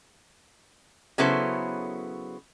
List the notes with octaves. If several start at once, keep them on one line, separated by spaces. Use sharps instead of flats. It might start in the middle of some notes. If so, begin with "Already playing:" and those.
C#3 F#3 B3 E4 A4 C5